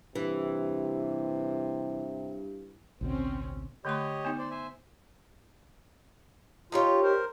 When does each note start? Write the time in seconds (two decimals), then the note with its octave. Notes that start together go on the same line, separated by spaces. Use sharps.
0.15 G2 C3 E3
3.01 A1 D2 B2 C4 C#4
3.85 D3 A3 G4 C#5 D#5 C6
4.25 B3 D#4
4.38 C5 D5
4.50 C5 E5 G#5
6.72 D#4 F4 G4 C#5
7.02 A#4 C5